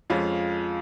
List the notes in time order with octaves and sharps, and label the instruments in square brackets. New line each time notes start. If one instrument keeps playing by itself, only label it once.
[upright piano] F2 F3 G#3 C#4 F4 F5